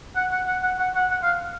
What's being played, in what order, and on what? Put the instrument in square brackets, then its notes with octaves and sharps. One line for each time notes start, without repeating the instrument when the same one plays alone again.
[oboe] F#5
F#5
F#5
F#5
F#5
F#5
F#5
F5